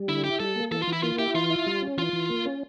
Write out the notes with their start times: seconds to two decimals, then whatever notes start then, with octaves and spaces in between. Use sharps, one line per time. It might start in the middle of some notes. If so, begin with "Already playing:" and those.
Already playing: G3
0.09 D3 E4
0.24 E4 G4
0.40 G3 A4
0.56 A#3
0.71 E3 A4
0.82 F4
0.87 E3
0.93 E4
1.03 A#3 F4
1.19 E4 G4
1.34 E3 F4
1.50 E4
1.66 G3
1.82 C#4
1.98 E3 F4
2.13 E3
2.30 A#3
2.46 C#4